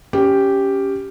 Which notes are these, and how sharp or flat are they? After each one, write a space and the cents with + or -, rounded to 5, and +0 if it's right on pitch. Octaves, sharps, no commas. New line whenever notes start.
C#4 +10 G4 +0